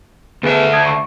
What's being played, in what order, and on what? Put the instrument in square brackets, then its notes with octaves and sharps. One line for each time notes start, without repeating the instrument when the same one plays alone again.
[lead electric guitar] D2 E5 [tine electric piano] B3 G#4 B4
[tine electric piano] D#6 G#6
C#6